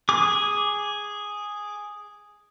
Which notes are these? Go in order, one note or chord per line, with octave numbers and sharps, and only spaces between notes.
G#4 D6